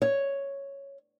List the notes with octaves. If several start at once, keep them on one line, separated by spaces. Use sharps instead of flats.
C#5